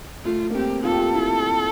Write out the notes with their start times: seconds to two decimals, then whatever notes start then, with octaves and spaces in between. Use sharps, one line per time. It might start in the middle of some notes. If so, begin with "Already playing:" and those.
0.24 A3 F4
0.51 A#3
0.55 C4 G4
0.84 F4 A4
0.91 G4
0.98 F4
1.14 E4